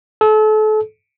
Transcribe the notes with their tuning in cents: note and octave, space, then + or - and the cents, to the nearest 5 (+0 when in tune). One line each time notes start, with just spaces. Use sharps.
A4 -35